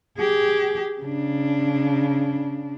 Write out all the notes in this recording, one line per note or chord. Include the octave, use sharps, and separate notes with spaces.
G4 G#4
C#3 D4